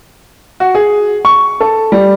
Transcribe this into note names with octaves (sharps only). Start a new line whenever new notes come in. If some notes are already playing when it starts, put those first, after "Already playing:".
F#4
G#4
C#6
A4
G3